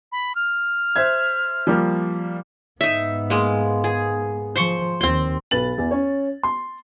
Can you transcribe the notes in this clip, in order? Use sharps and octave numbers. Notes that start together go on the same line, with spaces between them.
B5
F6
C5 E5 G#6
F3 G3 A#3
G#2 B3 D#4 E5
G#3 A#3
G#4
F3 C5 C6 C#6
D#2 C4 C6
B1 B4 A6 F#7
E2
C#4 C#5
C6